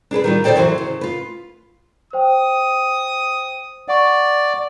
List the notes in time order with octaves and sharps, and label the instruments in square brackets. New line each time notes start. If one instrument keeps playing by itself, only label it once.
[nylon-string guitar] D4 G#4 A4 B4
D#3 G3 F4
B2 D3 A4 C5 D5 G5
E3 F#3 C5
C#3
F4 B4
[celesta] C5 G5 [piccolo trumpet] D#6
[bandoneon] D5 [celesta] F#5 C#6